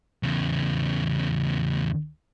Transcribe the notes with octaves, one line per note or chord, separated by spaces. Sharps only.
E2 C#3